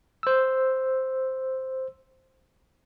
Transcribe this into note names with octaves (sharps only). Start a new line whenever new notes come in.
C5 E6